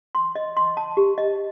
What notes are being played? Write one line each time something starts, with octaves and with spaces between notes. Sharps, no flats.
C6
D#5
C6
A5
G4
D#5